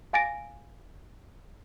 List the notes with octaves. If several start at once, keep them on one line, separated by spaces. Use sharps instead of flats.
F5 G#5 A6 A#6 D7